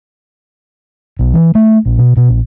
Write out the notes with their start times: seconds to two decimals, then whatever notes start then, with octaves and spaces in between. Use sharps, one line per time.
1.19 B1
1.34 E3
1.55 A3
1.86 A#1
1.99 B2
2.17 B2
2.29 A#1